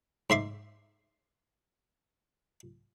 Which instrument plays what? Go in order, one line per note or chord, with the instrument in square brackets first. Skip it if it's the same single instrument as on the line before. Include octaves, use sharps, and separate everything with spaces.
[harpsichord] G#2 E5 C6 D6